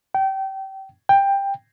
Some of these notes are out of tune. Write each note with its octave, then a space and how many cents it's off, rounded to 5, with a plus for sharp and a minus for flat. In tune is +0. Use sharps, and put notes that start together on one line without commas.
G5 -25
G5 +15